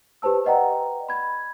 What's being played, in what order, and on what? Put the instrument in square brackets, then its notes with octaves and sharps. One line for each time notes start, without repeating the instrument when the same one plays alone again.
[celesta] G4 B4 C5 A5 E6
B4 D5 D#5 F#5 G5 A#5
B5 G#6